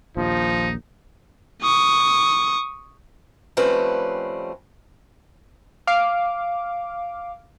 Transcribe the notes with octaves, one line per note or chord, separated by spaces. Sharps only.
A#1 D#2 F3 D#4
C#6 D#6
F3 G3 A3 C4 C#4 B4
F5 D6